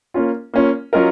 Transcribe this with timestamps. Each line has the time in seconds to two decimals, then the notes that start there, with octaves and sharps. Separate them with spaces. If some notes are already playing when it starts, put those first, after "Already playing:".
0.14 A#3 C#4 F4
0.54 A#3 C#4 F4
0.93 F#3 C#4 F4 A#4 D#5